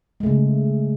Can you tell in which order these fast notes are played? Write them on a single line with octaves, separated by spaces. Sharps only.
G#3 A3 C#3